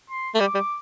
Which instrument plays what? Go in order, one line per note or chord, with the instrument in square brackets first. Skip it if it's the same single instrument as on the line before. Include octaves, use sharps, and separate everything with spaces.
[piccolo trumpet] C6
[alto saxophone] A3
[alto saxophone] G3 [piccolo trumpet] D6
[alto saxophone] G3